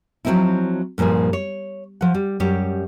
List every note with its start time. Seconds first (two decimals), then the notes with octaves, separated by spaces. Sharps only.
0.25 F3 F#3 G#3 C4 D#4 E4
0.98 G2 A#2 F3 G3 G#4
1.33 C#5
2.01 F3 F#5
2.15 G3
2.40 F#2 G3 G4 C#5